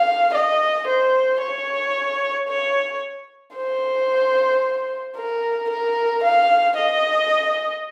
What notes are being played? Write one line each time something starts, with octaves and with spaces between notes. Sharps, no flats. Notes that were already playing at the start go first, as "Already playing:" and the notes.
Already playing: F5
D#5
C5
C#5
C#5
C5
A#4
A#4
F5
D#5